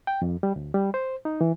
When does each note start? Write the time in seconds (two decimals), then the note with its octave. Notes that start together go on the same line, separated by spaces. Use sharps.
0.07 G5
0.22 F2
0.43 G3
0.56 D2
0.74 G3
0.94 C5
1.25 D#4
1.41 E3